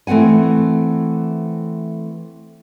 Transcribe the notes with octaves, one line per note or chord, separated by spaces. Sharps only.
E3 A3 C4 F#5 G#5